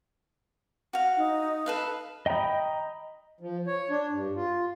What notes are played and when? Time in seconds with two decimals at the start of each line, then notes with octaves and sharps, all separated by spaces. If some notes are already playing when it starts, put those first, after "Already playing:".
0.93 F#4 F5
1.17 D#4
1.66 A4 B4 F5
2.26 D#5 G5 A#5 B5 D#6
3.40 F3
3.67 C#5
3.90 D4
4.12 G2
4.36 F4